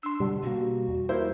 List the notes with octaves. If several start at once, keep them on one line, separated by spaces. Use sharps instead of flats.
D4 C6 E6
B2 D3 G3
B2 A#3 F#4
E2
A#3 E4 C5